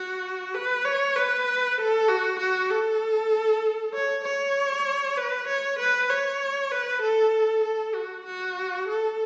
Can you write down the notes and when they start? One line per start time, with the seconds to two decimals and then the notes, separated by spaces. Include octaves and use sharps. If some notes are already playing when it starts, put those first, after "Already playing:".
Already playing: F#4
0.54 B4
0.85 C#5
1.16 B4
1.78 A4
2.08 F#4
2.39 F#4
2.70 A4
3.93 C#5
4.24 C#5
5.17 B4
5.47 C#5
5.79 B4
6.09 C#5
6.71 B4
7.02 A4
7.63 A4
7.94 F#4
8.26 F#4
8.87 A4